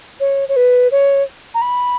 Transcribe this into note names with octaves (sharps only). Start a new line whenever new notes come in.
C#5
C#5
B4
C#5
A#5
B5